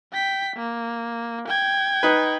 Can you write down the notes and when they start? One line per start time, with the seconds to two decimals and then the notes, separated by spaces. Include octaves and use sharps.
0.13 G5 B6
0.56 A#3
1.48 G5 G#6
2.03 D#4 B4